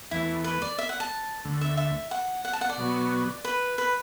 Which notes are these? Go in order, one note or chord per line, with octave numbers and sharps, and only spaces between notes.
E2 E3 A3 E4
B4
D5
E5
F#5
A5
D2 D3 A3
E5
E5
F#5
F#5
A5
F#5
D5
B2 F#3 B3 F#4
B4
B4